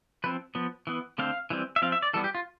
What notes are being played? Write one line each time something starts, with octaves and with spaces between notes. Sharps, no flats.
F3 C4 B4
F3 B3
E3 B3
D3 A3 C4 F5
E3 G3 C4
E5
F3 C4 F5
E5
D5
E3 G3 B3 A4
G4
F4